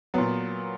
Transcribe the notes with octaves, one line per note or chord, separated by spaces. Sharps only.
A#2 F#3 B3